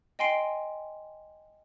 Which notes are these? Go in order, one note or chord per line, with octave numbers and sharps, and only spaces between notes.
D#5 G5 G#5 C6 C7 D7